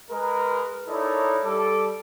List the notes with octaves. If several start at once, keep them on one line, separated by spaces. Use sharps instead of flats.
G#3 A#4 B4
D#4 E4 A4 A#4 C#5 D5
G3 A4 D6